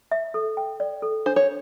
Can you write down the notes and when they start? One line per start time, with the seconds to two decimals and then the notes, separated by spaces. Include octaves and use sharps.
0.12 E5
0.34 A4
0.57 G5
0.80 D5
1.02 A4
1.26 D4 C5
1.36 C#5